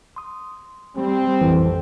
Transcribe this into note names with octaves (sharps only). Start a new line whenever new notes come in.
C6 D#6
G3 C4
A1 F2 E3